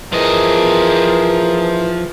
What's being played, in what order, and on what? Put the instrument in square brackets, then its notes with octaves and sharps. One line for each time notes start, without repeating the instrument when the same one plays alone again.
[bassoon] E3 [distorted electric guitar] F3 D#5 [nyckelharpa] G#4 A#4